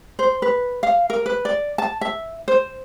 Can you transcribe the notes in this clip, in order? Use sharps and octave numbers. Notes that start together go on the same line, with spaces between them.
C5
B4
F5
A#4
B4
D5
A5
E5
C5